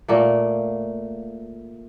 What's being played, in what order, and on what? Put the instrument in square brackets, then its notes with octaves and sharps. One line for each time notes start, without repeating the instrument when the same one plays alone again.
[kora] A#2 A3 A#3